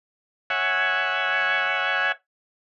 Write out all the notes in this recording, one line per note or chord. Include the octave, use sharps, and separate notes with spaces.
C#5 E5 F#5 G#5